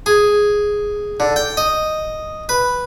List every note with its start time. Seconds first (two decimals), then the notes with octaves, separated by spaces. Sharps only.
0.06 G#4
1.20 D3
1.36 G5
1.57 D#5
2.49 B4